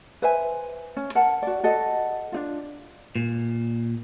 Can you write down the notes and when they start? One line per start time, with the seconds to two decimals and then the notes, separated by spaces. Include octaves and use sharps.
0.22 B4 C5 E5 G#5
0.96 C#4
1.15 A#4 F#5 A5
1.42 F#4 D5
1.63 F#4 A4 D#5 F#5
2.32 D4 D#4 F4
3.16 A#2